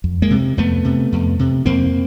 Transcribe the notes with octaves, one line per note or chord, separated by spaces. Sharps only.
F2
G#3 A#3
C3
F2 A3 B3
C3
F2
C3
F2 A#3 C4